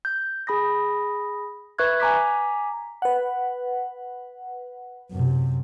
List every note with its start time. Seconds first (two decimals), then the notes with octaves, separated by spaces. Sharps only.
0.05 G6
0.47 G#4 B5 D#6 A#6
1.78 B4 E5 C#6 F#6 G#6
2.00 G#5 A#5 D6 B6
3.02 B4 F#5
5.12 F#2 C3